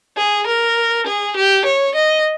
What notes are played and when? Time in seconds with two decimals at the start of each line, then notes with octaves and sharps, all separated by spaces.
0.17 G#4
0.47 A#4
1.07 G#4
1.36 G4
1.65 C#5
1.95 D#5